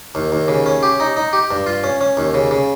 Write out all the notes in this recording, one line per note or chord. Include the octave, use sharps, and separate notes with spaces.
D#2
D#2
C#3
C#4
G4
D#4
D#4
G4
G2
F4
C#4
C#4
D#2
C#3
C#3